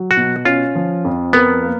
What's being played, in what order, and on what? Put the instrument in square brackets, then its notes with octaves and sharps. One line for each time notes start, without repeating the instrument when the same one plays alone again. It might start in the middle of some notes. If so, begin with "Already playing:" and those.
Already playing: [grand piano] F#3
[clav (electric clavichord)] F#4
[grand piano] B2
[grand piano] C#4 [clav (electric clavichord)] F4
[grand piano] F3
F2
[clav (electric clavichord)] B3 [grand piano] A#4
[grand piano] A#3